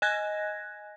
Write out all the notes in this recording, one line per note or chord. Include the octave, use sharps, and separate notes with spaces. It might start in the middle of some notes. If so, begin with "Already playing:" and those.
D#5 G#5 F#6 G#6 A#6